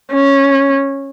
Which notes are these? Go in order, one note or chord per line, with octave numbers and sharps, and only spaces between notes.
C#4